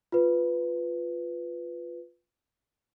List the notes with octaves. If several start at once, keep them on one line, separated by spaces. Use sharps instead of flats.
F4 B4